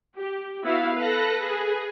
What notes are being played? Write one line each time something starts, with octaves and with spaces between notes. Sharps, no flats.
G4
B3 E4 F#4 F5
A4 B4 F#6 A#6
G#4